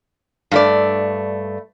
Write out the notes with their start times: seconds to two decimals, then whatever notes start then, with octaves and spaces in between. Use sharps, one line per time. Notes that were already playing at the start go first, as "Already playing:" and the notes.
0.51 G2 A3 D5